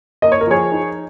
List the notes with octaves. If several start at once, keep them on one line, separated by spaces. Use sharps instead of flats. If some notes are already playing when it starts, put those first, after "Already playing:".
A#3 D#5
C#5
A#4
F3 G#4 C#5
D#4